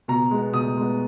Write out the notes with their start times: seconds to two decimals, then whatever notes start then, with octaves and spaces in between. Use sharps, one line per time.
0.08 B2 A#5
0.31 G#3 B3
0.53 B2 D#6
0.77 G#3 B3